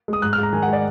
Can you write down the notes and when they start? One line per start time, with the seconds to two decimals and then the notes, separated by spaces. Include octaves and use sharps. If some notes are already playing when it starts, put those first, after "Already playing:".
0.08 G#3 D#6
0.22 G#2 F#6
0.33 F6
0.38 G#2
0.43 A#5
0.53 D#3 G#5
0.62 F#5
0.68 G#3 D5